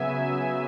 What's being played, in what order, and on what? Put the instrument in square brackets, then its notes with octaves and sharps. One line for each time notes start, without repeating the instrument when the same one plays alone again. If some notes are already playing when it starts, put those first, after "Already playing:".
Already playing: [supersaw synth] C#3 F#3 B3 E5 G#5